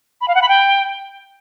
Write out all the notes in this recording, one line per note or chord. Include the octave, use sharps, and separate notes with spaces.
B5
F5
F#5
B5
G5